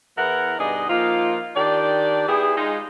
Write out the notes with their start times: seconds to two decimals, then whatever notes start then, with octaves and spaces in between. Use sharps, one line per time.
0.18 E2 B3 E4 A#4 F#5
0.59 G2 B2 D#4 G#4 D5 D#5
0.89 F3 A#3 D#4 F4
1.56 D#3 D4 G4 D5
2.28 B3 E4 G4 G#4
2.57 G#3 D#4 F4